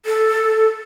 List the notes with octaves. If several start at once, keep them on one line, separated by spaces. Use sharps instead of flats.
A4